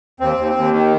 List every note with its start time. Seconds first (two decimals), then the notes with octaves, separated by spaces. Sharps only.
0.20 D#2 C4
0.37 D#2
0.55 D#2
0.72 D#3